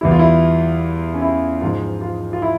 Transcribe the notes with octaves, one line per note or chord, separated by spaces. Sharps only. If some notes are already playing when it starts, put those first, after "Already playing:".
E2 E3 G3 E4
F4
E4
C#4
E4
G#2 F3 G#3 F4
F4
F4
E4